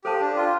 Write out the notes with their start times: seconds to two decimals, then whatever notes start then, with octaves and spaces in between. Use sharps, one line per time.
0.04 G4 A4 C5 F5 A5 C6
0.21 D4
0.36 F4